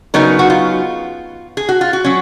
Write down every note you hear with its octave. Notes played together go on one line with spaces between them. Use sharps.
C#3 F#3 B3 D#4 A#4
F#4
F4
G#4
F#4
F4
F#4
F#3 C#4